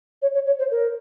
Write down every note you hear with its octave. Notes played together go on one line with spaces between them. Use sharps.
C#5
C#5
C#5
C5
A#4